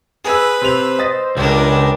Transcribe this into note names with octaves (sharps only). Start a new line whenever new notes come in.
G#4 B4 G#5 E6
C3 C5 F7
D#5 D#6 A6
C#2 G3 D4 A#4